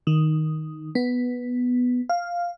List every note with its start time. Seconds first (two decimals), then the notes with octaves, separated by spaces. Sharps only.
0.07 D#3
0.95 B3
2.09 F5